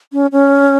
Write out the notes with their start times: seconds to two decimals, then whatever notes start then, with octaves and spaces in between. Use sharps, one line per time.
0.13 C#4
0.32 C#4